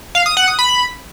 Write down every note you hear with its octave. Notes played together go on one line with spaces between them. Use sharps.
F5
D#6
F#5
D#6
B5